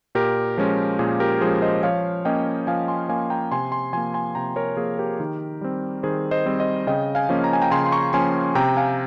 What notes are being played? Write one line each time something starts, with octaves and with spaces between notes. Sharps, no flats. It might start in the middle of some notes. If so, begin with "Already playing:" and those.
A#2 G4 A#4
F3 G#3 C#4
A#2 G#4
G4 A#4
F3 G#3 C#4 G#4 C5
C5 D#5
F3 C#5 F5
A#3 C#4 D#5 G5
F3 F5 G#5
G#5 C6
A#3 C#4 F5 G#5
G5 A#5
C3 G#5 C6
G#5 C6
F3 A#3 G#5 C6
G#5 C6
C3 G5 A#5
A#4 C#5
F3 A#3 G#4
G4 A#4
D#3
G3 C4
D#3 G#4 C5
C5 D#5
G3 C4
C5 D#5
C#3 D#5 G5
F5 G#5
F3 A#3 C#4
A#5
G#5
G5 A#5
C#3 G#5 C6
C6
A#5 C#6
F3 A#3 C#4 G#5 C6
C3 G5 A#5
F5 G#5